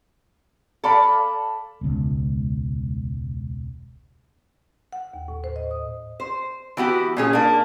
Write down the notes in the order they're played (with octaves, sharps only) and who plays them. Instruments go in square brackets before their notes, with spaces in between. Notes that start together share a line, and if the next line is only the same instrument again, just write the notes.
[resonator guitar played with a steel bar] A4 D5 F5 [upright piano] A5 B5
[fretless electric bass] E1 C#2
[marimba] F#5
D#2
A2
C5
D#5
D#6
[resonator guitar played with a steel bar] C5
E3 B3 F#4 G4
A#2 C#4 G#4
A#3 D4